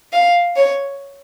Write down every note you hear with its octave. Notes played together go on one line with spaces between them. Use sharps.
F5
C#5